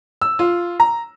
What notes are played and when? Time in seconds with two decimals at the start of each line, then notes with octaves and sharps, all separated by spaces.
0.22 E6
0.39 F4
0.80 A#5